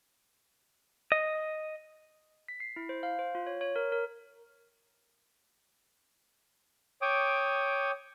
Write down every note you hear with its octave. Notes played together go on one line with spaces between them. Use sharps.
D#5
B6
C7
E4
C5
F5
C5
F4
C#5
C#5
A#4
A#4
C#5 G5 D6 D#6